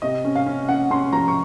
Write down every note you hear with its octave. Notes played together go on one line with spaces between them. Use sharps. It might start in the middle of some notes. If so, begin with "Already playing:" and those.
C3 D#5
C#4
F5
C#4
C#4 F#5
C#4 C6
F3 A#5
C#6